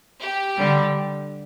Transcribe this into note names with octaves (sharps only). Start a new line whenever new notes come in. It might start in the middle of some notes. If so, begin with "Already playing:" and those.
G4
D3 G3